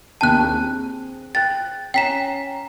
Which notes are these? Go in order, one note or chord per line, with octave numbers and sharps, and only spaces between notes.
D#2 D4 G5 A5 F#6
C4 G#4
G5 F#6 A6
C#4 G5 A#5 B6 E7